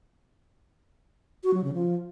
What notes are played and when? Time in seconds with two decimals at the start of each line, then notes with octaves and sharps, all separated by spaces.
1.43 F#4
1.54 F#3
1.64 C#3
1.74 F3